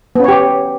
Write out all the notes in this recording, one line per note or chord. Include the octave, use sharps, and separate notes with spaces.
B3 C#4 G4 C#5